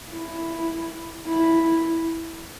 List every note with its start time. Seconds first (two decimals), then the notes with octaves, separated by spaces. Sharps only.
0.11 E4
1.26 E4